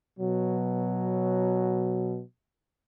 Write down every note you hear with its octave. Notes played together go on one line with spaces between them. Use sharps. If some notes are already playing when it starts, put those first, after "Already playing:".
B2 F#3